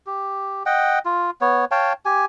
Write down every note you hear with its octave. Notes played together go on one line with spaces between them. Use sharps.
G4
D#5 F#5 G5
F4
B3 C#5
C#5 F5 G5 A5
G4 G#5